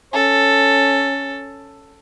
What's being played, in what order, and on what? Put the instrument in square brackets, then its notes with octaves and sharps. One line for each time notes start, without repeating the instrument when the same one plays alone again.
[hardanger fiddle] C#4 A4